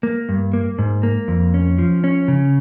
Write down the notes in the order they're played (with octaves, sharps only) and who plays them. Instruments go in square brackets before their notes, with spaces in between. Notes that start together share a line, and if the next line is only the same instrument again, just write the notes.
[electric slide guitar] A#3
G2
A#3
G#2
A#3
F2
C#4
F3
C#4
C#3